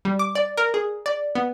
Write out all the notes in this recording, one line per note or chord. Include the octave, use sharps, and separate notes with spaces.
G3
D6
D5
A#4
G#4
D5
B3